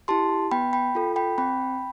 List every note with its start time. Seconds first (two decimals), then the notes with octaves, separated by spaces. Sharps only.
0.08 E4 G4 A5 C6
0.51 B3 G5 B5
0.73 G5 B5
0.95 F4 A4
1.16 G5 B5
1.38 C4 G5 B5